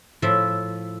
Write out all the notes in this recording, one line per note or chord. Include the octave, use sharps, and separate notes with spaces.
A2 F3 E5